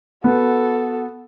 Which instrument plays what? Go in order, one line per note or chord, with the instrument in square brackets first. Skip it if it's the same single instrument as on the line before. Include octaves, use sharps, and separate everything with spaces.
[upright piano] B3 [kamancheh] F#4 A4